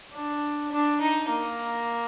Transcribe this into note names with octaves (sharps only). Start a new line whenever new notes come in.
D4
D4
D#4
A#3